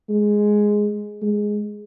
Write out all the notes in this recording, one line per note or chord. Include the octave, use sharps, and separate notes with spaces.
G#3
G#3